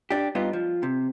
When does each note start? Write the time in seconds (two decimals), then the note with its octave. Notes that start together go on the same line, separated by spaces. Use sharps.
0.11 D4 G4
0.35 G2 B3 D#4 F4
0.53 F3
0.83 C3